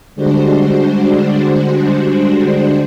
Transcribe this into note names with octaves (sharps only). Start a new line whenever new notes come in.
D3 G3 G#3 D4 F#4 C5